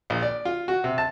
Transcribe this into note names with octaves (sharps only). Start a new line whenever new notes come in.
A#1
D5
F4
F#4
C3
A5